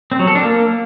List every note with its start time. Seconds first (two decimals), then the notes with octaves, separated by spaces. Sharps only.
0.12 C4
0.19 F#3
0.27 A4
0.35 D4
0.43 A#3